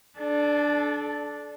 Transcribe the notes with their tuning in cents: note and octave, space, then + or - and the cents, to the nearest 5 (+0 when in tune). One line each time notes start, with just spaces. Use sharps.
D4 +0 A4 -35